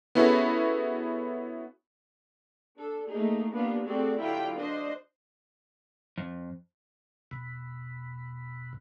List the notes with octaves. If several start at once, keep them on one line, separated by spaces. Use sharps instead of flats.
B3 C#4 E4 F#4 G#4 A4
D4 A4
A3 A#3 D#4 G#4
A#3 B3 D4 F4 G4
A3 C4 F#4 G#4 A4 D5
D3 F#3 E4 F4 G4 G5
D4 C5 D#5
F2
E2 B2